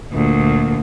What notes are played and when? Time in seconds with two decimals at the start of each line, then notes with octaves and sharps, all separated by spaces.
0.12 D2 A#2